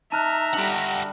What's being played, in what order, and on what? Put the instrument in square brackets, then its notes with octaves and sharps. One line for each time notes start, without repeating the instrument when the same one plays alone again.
[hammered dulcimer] D#4 [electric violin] E5 A#5 [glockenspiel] A5 F6 F#6
[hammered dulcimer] D3 G3 D4 [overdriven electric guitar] G4 F#5